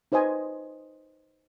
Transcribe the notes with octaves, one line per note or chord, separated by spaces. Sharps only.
D#4 B4 C5 D#5 G#5